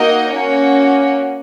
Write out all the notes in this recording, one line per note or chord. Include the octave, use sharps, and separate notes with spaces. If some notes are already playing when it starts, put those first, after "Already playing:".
Already playing: A#3 D#4 F#4 A#4 D#5
A#3 C#4 F#4 C#5